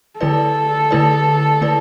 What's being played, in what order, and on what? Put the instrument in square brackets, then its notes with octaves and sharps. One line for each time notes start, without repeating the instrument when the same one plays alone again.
[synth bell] D3 A3 E4 B4 D5 [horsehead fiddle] A4
[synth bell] D3 A3 E4 B4 D5
D3 A3 E4 B4 D5